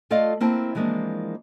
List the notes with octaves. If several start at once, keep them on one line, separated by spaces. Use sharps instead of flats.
A3 F4 A4 D5 D#5 F5
A#3 C4 E4 G5 A5
E3 F3 G#3 A#3 C4 D4